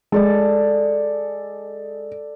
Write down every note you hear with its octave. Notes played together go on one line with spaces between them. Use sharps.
G#3 A4 D5 A5